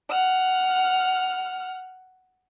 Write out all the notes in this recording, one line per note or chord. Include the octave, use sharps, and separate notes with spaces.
F#5 F6